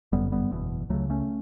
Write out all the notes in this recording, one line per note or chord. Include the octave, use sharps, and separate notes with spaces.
G1 F#2 D3 G3 B3
G3 B3
F#1 E2 B2
C#2 C#3 F#3 A3
A3 C#4